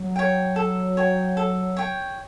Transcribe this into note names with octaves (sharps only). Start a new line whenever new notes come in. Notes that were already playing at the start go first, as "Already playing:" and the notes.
Already playing: F#3
C#5 G5
A4
C#5 G5
A4
C#5 G5